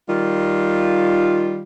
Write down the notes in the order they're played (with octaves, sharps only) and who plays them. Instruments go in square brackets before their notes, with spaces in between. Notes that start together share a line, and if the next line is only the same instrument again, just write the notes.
[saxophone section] D#3 G3 F4